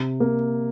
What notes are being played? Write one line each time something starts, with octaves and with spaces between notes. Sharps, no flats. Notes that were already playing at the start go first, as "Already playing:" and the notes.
Already playing: C3
A#3